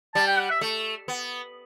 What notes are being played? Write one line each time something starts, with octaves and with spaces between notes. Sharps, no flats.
G3 A5
G5
F#5
E5
A3
B3